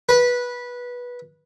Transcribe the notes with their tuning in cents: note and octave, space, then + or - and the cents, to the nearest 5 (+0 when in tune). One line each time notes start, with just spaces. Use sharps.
B4 -15